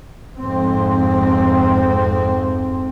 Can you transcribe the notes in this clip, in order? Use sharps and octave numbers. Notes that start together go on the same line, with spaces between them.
F2 G#2 C4